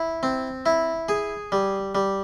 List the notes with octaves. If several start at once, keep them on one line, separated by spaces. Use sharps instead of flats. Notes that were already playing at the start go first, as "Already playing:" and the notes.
Already playing: E4
C4
E4
G#4
G3
G3